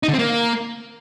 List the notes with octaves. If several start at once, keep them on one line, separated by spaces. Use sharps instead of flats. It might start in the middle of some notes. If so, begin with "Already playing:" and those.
D#4
D3
C4
A#3